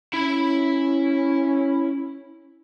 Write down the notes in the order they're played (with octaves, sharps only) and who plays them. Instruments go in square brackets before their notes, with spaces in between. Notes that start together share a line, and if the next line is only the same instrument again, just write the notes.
[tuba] C#4 [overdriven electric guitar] E4 B5